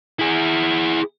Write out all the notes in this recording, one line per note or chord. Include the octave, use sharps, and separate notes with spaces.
E4 G#4